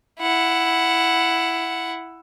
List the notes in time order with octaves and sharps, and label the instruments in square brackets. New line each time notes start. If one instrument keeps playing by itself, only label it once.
[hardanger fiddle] E4 F#5